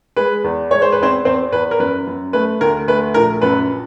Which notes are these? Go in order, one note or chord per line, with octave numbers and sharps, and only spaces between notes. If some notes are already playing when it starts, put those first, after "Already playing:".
G#3 B4
E2
G#3 C#5
C5
B4
E2 C4 C5
E2 C4 C5
E2 B4
A#4
F#2 B4
F#2
A3 B4
D2 A#4
A3 B4
A#1 A#4
F#2 B4